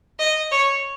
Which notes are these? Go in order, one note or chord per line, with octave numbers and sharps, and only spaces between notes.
D#5
C#5